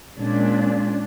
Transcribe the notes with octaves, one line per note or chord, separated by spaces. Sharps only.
A#2 G#3 C#4 D4